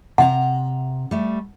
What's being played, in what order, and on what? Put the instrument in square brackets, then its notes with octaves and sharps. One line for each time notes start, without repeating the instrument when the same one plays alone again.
[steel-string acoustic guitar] C3 F5 A#5 [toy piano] F#5
[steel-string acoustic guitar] G3 A3